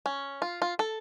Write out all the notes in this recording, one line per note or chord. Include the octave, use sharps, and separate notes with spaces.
C#4
F4
F4
A4